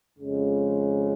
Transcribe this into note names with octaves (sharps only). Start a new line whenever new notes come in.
F2 C#3 G#3